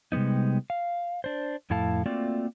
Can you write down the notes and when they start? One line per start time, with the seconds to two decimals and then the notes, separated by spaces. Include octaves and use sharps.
0.12 C3 G3 G#3 B3 D#4
0.70 F5
1.24 D4 C5
1.70 F2 A2 E4 A4 F5 A5
2.06 A3 A#3 C4 F4 F#4 D5